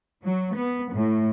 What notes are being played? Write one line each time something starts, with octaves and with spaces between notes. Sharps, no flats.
F#3
B3
A2